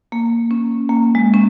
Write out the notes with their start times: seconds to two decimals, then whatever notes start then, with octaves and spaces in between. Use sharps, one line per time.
0.12 A#3
0.51 C#4
0.89 A#3
1.15 G#3
1.34 C#4